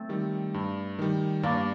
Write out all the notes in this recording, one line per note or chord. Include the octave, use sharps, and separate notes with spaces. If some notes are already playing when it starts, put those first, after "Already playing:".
Already playing: A3 C4
D#3 G3
G2
D#3 G3
G2 A#3 D4